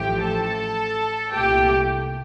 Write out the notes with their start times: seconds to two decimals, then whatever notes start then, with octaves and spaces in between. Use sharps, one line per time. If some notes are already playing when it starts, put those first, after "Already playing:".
Already playing: A1 A2 F3 A3 G4 G5
0.23 A4 A5
1.33 C2 A#2 A3 G4 G5